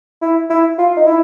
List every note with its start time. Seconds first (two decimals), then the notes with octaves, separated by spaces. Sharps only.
0.21 E4
0.50 E4
0.78 F4
0.97 D#4
1.07 E4